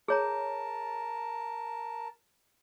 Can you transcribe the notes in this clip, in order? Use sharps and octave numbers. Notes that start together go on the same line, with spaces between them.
G#4 A#4 C#5 A5 A#5